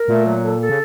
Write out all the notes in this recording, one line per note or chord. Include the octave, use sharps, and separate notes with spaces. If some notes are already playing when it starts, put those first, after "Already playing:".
Already playing: A#4
A#2 A3
F#3
A4
A4
C#3